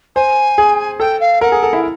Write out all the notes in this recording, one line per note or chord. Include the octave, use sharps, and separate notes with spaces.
C5 G#5
G#4
A4 G5
F5
A#4 F#5
G#4
A4
E4